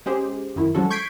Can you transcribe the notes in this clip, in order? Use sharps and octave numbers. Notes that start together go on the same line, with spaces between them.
G#3 C#4 G4 G#4 C5
F#2 D#3 E4
F3 F#3 G#3 C#4 F#4 A4
C#6 G6 G#6 B6 C7 D7